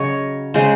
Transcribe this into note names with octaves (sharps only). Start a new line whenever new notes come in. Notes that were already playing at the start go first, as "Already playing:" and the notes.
Already playing: C#3 F#3 C#5 D#5
C#3 G#3 C5